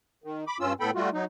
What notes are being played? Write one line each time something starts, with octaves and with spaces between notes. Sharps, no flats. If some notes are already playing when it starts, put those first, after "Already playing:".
D#3
B5 D6
G2 C#4 F4 E6
A2 B3 A4 G5 B5
G3 A3 F4 F#4
F#3 D#4